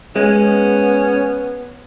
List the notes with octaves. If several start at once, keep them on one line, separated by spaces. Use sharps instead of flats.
G#3 B3 C#4